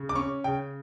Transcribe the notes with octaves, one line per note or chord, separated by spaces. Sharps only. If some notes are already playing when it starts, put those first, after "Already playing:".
Already playing: C#3
D6
C#4 C#6
C#3 G5